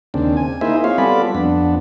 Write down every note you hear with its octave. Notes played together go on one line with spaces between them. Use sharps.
D#2 C#3 C4 D4
G#5
A#3 D#4 E4 G#4 C5 E5
C4 F4 G#4 C#5 F5
G3 B3 F4 A4 D5 B5
F2 B3 D4